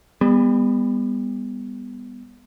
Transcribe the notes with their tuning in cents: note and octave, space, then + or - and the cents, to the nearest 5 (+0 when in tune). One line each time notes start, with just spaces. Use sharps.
G3 +40 B3 +0